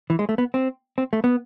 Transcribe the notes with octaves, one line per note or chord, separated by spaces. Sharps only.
E3
G#3
A3
B3
C4
C4
A3
B3